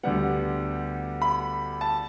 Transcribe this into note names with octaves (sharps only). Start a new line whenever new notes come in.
D2 D3 G3 B3 F#5
B5
A5